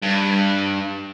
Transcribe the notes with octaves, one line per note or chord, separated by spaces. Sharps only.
G2